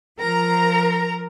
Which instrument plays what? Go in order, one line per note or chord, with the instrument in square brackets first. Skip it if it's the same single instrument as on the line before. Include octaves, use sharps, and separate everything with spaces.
[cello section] F3 [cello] A#4 [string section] A#5